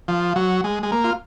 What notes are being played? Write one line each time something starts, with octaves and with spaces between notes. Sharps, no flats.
F3
F#3
G#3
G#3
A#3
F4